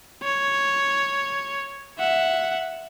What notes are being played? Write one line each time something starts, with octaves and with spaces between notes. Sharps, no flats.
C#5
E5 F#5